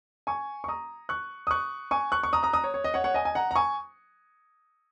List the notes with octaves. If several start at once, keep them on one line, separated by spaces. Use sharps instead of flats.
G#5 C#6
C#6
A#5 D#6
C#6 F#6
D#6
C#6 F#6
G#5 C#6
C#6 F#6
C#6
A#5 D#6
A#5 D#6
A#5 D#6
C#5
C#5
D#5
C#5 F#5
C#5 F#5
D#5 G#5
G#5
F#5 A#5
A#5
G#5 C#6